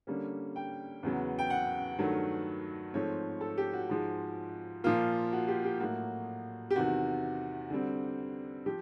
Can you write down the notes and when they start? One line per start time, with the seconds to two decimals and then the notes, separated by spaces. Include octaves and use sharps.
0.07 D3 G3 A#3 C#4
0.56 G5
1.03 E2 C#3 F#3 B3
1.39 G5
1.50 F#5
1.98 G2 D#3 F#3 A3
2.93 G#2 F3 A3 C4 C#5
3.41 A4
3.58 G4
3.73 F#4
3.89 G#2 F3 G#3
4.84 A#2 F3 A#3 F4
5.32 F#4
5.48 G4
5.64 G4
5.80 A2 F#3 A#3 F#4
6.71 G4
6.76 E2 C3 D#3 F#4
7.70 D3 G3 C4
8.66 F3 G4